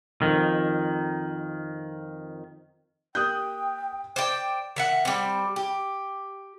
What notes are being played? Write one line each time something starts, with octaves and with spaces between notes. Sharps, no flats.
F2 G#2 D#3
A#3 G4 G5 D#6 F#6 G6
C5 D5 G5
D#3 E5 F#5
G3 C4
G4